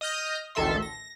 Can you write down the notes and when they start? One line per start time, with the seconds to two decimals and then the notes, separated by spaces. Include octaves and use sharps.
0.01 D#5 D#6 F6 G6 A#6
0.55 A1 D2 D#3 A4 E5 C6
0.82 A#6